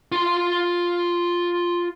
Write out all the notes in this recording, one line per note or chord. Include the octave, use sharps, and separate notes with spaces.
F4 C6